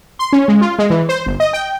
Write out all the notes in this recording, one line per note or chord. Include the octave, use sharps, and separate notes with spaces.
C6
C#4
G#3
F4
G#3
E3
C5
G1
D#5
G5